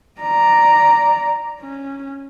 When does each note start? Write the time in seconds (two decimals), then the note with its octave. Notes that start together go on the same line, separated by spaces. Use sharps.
0.21 D5 A#5
1.61 C#4